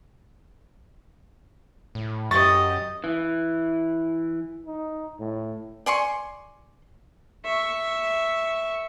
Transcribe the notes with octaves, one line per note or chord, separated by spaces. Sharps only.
A2
F#2 G4 D#5 C#6 A6
E3
D#4
A2
D5 G#5 C6 C#6
E5 C#6